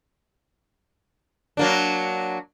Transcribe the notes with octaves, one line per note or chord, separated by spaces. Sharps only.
F#3 A#3 D4